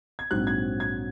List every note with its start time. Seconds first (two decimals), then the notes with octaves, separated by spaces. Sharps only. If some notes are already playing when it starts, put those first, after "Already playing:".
0.19 G#6
0.31 A#1 G#2 F#3 C4 F#6
0.47 G#6
0.80 G#6